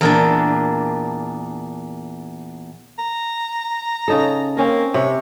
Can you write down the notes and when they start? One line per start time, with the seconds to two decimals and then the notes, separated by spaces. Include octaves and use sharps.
0.01 E2 A#2 D4
2.99 A#5
4.08 C#3 D#4 A4
4.57 A#3 C4 C#4 A#4
4.94 C3 C#5